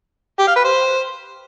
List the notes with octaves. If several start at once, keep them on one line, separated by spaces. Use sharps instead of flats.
G4
F5
B4
C5